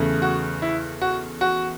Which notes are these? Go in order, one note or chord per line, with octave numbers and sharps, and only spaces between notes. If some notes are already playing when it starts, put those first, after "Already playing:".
Already playing: E2 C#3 A3
F#4
E4
F#4
F#4